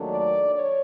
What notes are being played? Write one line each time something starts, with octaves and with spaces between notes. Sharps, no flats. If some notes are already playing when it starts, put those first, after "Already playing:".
Already playing: D#2 D#3 F#3 A3 D4
D5
C#5